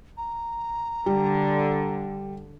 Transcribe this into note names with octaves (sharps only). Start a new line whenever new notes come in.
A#5
D3 G3